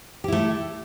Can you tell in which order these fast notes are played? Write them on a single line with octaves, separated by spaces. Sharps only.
G4 E4 A3